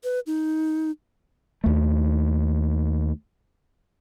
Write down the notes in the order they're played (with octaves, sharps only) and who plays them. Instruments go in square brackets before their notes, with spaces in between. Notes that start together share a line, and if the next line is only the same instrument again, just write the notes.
[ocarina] B4
D#4
[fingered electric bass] D#2 A3